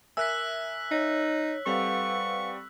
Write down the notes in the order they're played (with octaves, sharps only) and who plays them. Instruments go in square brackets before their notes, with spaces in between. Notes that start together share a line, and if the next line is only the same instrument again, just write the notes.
[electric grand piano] A#4 E5 G#5 [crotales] E6 F#6 B6
[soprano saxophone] D#4 [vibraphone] C#5
[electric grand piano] G3 C4 A4 [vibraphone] B4 F5 F#5 [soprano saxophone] C#6